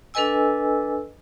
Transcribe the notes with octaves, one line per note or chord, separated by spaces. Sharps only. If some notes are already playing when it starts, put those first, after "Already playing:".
D4 A4 B4 D#5 G#5 E6